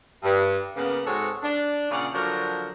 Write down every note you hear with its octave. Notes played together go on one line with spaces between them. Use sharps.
G2
C#3 A#3 B3
G#2 G#3 C4 F#4 A4 C#5
D4
A#2 C#3 C#5 D5 F5 F#5
D3 F3 F#3 D4 F#4 A#4